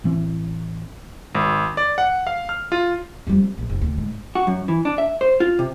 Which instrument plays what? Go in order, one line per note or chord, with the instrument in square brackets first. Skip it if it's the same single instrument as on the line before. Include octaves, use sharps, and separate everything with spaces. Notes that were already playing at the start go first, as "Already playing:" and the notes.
[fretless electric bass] A1 E3 C4
[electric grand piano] G#1
D5
F#5
F5
F6
F4
[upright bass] F2 G3
F#2
A#1
F1
D2
G#2
[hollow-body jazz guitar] F#4
F#2
E3
D4
E5
C5
F4
C3